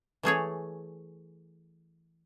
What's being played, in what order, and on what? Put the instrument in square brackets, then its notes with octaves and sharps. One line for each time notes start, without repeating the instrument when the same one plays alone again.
[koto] E3 A3 G#4 C#5